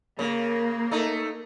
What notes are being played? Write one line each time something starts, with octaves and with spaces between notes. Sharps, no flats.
C#3 A#3
A3 D#4